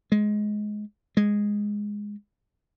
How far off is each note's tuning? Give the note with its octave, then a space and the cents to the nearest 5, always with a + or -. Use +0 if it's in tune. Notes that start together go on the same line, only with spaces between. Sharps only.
G#3 +15
G#3 -5